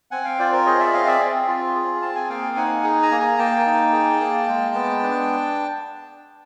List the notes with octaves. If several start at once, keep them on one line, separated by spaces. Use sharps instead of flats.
C4 F#5 G#5
F5 G5
F4 C5 D5
A#4 C5
G#4 C#5 D#5
D5 E5
C4 D#5 F5
D5 E5
C4
F4
G#4
C4 A5
G#5
A#3 F5 G5
D#4 F#5 G#5
G#4
G#5 A#5
A#3
G#5 A#5
A#3 G5 A5
D#4
G#4
A#3
G#3
B3
D4